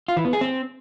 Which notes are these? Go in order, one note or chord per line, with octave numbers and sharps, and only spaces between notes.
F4
E3
B3
G#4
C4